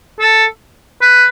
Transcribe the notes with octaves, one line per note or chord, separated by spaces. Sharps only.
A4
B4